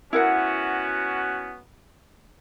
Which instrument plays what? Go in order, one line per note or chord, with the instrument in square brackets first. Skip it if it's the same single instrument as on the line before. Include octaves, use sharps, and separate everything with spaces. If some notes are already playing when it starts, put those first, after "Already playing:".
[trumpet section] B3 C#4 F#4 [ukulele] E4 A#4 F#5